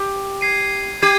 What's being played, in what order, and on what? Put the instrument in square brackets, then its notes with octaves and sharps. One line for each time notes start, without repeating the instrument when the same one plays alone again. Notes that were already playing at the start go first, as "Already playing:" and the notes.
Already playing: [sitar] G4
[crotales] G#6 C7 D#7
[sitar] G4 [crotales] G#6 C7 D#7